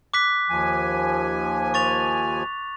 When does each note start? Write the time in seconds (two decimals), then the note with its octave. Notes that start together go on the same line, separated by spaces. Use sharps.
0.14 D6 F#6 B6
0.50 D#2 F3 G#5
1.74 C#6 A6 F7